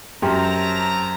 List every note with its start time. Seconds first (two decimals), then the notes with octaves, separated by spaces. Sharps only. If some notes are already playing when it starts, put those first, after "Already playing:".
0.22 F#2 C4 G4 G5 A5 A#5 C6